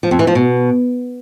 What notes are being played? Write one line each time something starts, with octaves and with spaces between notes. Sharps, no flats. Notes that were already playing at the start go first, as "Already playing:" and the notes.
F3
F2
E3
F3
B2